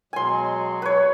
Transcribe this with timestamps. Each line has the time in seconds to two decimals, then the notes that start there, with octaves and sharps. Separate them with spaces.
0.13 B2 F#3 G#3 G#5 C6
0.82 B4 C#5